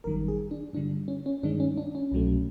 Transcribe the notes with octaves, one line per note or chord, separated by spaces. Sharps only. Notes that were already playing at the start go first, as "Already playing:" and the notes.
G#1 F#2 D#3 G3 A#4
G#4
D4
G2 D3 G3 D4
C#4
C#4
G2 D#3 G#3 D4
C#4
D4
C#4
C2 B2 F#3 A3